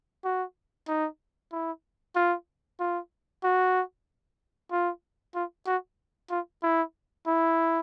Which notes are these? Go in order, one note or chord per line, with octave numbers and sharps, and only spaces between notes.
F#4
D#4
E4
F4
F4
F#4
F4
F4
F#4
F4
E4
E4